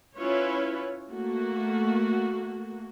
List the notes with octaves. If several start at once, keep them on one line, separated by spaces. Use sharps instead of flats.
C#4 E4 F4 B4 C#5
A3 A#3 F#4